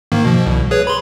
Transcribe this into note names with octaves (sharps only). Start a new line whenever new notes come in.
G#2 D#3 A#3
B2 F3
C2
G#4 B4 C#5
B5 C6